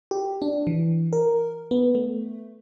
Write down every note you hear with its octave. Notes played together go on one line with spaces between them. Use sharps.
G4
D4
E3
A#4
B3
A3